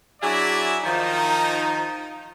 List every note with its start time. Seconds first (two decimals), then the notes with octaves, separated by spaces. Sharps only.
0.22 F#3 D4 E4 G#4 D5 E5
0.84 D#3 F3 D#4